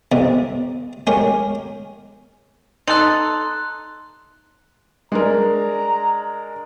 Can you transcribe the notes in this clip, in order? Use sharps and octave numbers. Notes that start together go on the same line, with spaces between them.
E2 C3 G3 D#4
G#3 C#4 G4 A#4
D#4 A4 A#5 C6 F#6
G#3 D4 A#4 A#5